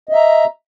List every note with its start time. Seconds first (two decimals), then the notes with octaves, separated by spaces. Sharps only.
0.09 D#5
0.12 E5
0.16 A#5